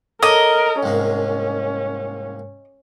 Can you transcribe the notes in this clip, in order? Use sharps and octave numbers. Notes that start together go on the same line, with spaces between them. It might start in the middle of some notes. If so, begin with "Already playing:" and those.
A4 A#4 C#5 D#5 C#6
C2 G#2 A#3 C#4